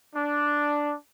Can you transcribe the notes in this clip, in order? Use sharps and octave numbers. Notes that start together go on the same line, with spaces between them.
D4